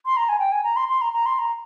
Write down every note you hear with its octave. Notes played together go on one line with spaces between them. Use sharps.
C6
A#5
G#5
G5
G#5
A#5
C6
C6
A#5
A#5
C6
A#5